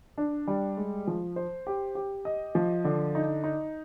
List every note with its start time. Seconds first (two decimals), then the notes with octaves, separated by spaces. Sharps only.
0.18 D4
0.47 G3
0.77 G#3
1.07 F3
1.36 C5
1.67 G4
1.95 G4
2.25 D#5
2.55 F3
2.85 D3
3.15 D#4
3.44 D#4